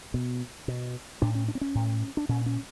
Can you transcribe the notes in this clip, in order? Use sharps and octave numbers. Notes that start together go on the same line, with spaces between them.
B2
B2
A2 D4
C#4
D4
C4
C#4
A2
D4
A#2 C#4
C#4